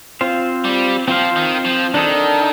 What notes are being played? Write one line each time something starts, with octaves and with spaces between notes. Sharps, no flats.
C4 F4 C5 F5
G3
F3 C4 F4 C5 F5
D#3
F3
D#3 D4 A4 D#5